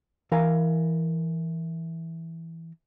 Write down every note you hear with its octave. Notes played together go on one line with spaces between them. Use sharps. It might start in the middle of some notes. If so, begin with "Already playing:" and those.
E3 A#4 F5 G#5